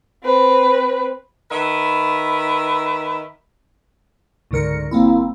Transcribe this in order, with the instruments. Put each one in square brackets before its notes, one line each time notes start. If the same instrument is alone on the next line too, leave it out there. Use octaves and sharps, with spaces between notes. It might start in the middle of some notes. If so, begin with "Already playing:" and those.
[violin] C4 B4
[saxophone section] D#3 B4 E5
[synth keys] C#2 G#2 D3 A#4 C#7
G1 A#3 C4 E4